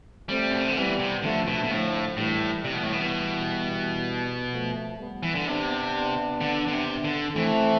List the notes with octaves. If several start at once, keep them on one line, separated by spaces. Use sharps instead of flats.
G3 A3 C4
B2
C3
D3
E3 G3 B3
C3
D3 F3 A3
B2
B2
A2 D3 F3
A2 E3 G3
C3 E3 G3
B2
A2
B2
F3 A3
G3 B3
E3
D3
C3 B3 D4
D3
D3
C3
D3
E3 A3 C4